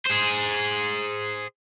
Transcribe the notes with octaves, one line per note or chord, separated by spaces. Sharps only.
G#4 C5